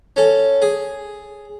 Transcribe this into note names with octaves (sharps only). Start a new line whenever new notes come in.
C#4 A4
G#4